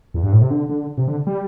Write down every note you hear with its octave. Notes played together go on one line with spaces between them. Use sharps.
E2
G2
A2
C3
D3
D3
C3
D3
G3